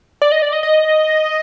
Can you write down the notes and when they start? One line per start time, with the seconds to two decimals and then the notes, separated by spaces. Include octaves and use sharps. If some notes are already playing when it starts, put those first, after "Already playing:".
0.22 D5
0.32 D#5
0.42 D5
0.53 D#5
0.63 D#5